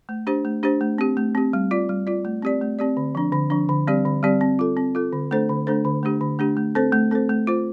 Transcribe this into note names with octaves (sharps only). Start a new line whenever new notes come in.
A3
D4 G4 C5
A3
D4 G4 C5
A3
C4 G4
A3
C4 G4
G3
F4 D5
G3
F4 D5
A3
C4 G4 D5
A3
C4 G4 D5
D3
F3 D4
D3
F3 D4
D3
G3 C4 G4 D5
D3
G3 C4 G4 D5
C4
F4 A4
C4
F4 A4
D3
A3 D4 A4 C5
D3
A3 D4 A4 C5
D3
A3 D4 G4
D3
A3 D4 G4
A3
C4 A4 C5
A3
C4 A4 C5
A3
F4 C5